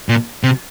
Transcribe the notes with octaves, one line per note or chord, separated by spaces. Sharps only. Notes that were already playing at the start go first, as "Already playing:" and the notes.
A#2
C3